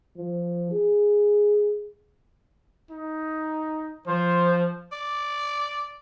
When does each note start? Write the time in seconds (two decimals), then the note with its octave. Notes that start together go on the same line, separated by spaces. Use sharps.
0.17 F3
0.72 G#4
2.91 D#4
4.07 F3 C5
4.92 D5